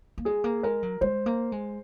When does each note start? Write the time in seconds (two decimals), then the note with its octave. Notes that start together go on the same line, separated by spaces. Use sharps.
0.18 A#3
0.25 G#3 G#4
0.44 A#3
0.63 G#3 A#4
0.83 F#3
1.01 G#3 C5
1.26 A#3
1.52 G#3